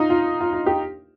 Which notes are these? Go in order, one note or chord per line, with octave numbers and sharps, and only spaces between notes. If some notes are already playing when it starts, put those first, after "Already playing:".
Already playing: D#4 F4
F4
F4
F4
G4